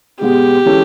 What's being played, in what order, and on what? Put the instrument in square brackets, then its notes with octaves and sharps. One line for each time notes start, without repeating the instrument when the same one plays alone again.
[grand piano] B2 G#3 B3 [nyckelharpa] G4
[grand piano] E3 G#3 C#4 E4 A4